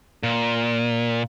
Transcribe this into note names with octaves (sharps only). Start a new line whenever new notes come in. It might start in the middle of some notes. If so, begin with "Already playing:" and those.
A#2